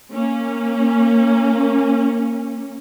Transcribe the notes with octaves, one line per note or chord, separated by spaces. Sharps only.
A#3 C#4